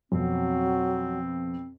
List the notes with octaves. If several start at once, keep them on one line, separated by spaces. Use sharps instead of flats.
F2 B2 F#3 C4